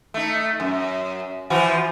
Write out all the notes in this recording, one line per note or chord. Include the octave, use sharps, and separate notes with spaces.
A3 D#4
F#2
E3 F3 F#4